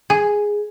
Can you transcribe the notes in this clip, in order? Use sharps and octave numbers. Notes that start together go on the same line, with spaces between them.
G#4